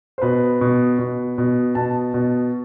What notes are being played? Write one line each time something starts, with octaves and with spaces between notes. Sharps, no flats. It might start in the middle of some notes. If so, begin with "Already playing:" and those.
C5
B2 B4
B2
B2
B2
B2 A5
B2